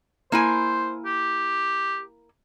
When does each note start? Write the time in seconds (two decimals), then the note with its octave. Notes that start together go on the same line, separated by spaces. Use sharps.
0.32 A#3 E4 C5 G#5
1.05 G4